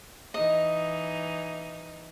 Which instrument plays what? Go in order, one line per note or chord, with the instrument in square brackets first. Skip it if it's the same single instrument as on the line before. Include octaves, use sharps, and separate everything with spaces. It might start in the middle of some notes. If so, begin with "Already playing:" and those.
[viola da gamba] E3 D#4 [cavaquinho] D#5